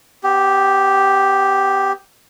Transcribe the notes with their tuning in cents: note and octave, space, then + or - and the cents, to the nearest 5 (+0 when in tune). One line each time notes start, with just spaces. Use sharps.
B3 +25 G4 +0